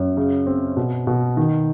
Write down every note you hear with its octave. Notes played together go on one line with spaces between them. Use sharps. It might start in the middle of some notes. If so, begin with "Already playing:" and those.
Already playing: F#2
C#3
C4
B2
B2
D#3